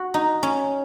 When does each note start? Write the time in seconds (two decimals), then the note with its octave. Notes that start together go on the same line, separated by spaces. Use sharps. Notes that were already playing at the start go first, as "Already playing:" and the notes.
Already playing: F#4
0.14 D#4
0.43 C#4